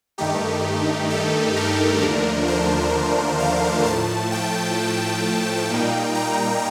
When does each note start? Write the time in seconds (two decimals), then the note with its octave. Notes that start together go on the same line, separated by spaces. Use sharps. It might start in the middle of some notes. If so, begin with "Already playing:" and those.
0.18 G2 D#3 A3 D#4 G4
1.10 A4
1.56 A#4
2.01 D#2 D3 F3 A3 D4
2.48 C5
3.40 F5
3.85 A2 F3 A3 A5
4.32 G5
5.70 A#2 G3 A#3 D#4
6.15 A#5